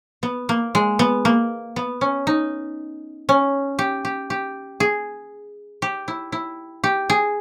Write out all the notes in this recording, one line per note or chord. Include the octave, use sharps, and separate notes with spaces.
B3
A#3
G#3
B3
A#3
B3
C#4
D#4
C#4
G4
G4
G4
G#4
G4
E4
E4
G4
G#4